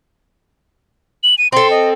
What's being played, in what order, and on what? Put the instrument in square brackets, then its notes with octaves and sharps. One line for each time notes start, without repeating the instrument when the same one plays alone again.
[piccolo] F#7
D#7
[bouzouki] C4 A4 [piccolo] C6
[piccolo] D#5